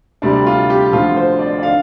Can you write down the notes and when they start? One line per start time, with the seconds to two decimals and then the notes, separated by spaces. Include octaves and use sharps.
0.22 D2 C3 G3 D4
0.46 F4
0.70 G4
0.92 D2 D3 F3 F4
1.17 C5
1.39 D5
1.59 D5
1.63 D3 F5